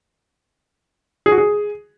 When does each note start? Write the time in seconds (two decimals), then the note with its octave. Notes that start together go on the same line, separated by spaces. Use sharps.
1.26 G#4
1.32 F#4
1.38 G#4